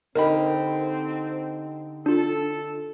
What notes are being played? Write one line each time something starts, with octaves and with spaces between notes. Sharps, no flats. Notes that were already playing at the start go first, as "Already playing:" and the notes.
D3 C4 D#4 G4 A#4 B5
D4 F4 A4